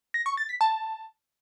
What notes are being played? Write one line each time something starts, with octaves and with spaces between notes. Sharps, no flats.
A#6
C#6
A6
B6
A5